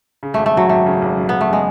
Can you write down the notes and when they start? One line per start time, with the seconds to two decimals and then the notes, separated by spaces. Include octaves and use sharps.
0.23 C#3
0.34 G#1 A3
0.46 A3
0.54 F#2 F#3
0.69 G#1 A3
0.86 C#3
1.02 G#1
1.17 F#2
1.29 G#1 B3
1.41 A3
1.49 C#3 G#3